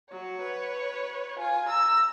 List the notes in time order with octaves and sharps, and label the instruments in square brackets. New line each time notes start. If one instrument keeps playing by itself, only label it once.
[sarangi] F#3 [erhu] C#5
[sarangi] B4
[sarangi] F4 [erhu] G#5
[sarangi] A#5 [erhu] E6